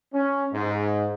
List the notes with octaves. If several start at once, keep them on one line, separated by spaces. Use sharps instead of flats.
C#4
G#2